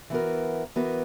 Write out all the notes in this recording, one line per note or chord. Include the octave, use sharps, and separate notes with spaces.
E3 B3 F#4 A#4
E3 B3 F#4 A#4